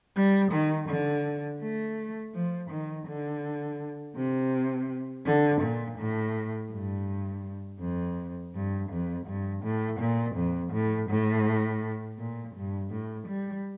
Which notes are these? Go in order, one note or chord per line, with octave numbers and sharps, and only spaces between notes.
G3
D#3
D3
A3
F3
D#3
D3
C3
D3
A#2
A2
G2
F2
G2
F2
G2
A2
A#2
F2
A2
A2
A#2
G2
A2
G3